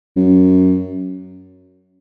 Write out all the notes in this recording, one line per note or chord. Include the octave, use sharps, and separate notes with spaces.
F#2